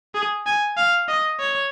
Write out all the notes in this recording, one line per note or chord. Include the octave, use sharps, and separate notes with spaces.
G#4
G#5
F5
D#5
C#5